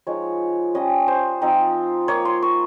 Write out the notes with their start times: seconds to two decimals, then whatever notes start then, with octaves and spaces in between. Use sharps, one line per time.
0.07 F3 G#3 D#4 C#5
0.74 G3 C#4 F4 D#5
1.08 C5
1.42 F3 C4 D#4
2.08 A#3 F4 C#5
2.25 C6
2.42 C#6